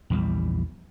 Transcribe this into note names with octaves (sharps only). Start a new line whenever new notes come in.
A#1 E2 E3 G3